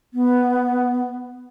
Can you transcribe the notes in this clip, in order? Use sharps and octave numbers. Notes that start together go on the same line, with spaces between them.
B3